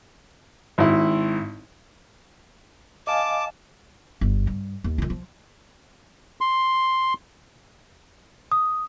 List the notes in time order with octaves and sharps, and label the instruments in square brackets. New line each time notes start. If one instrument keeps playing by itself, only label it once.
[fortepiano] G#1 E4
[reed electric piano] D#5 F5 G#5 [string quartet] A5 [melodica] D6
[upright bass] G1
G2
D#2
D#3 F4
F3
[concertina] C6
[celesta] D#6